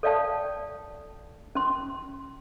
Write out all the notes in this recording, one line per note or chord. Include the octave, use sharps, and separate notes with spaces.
A4 C#5 D5 F5 G5 A5
C#4 C6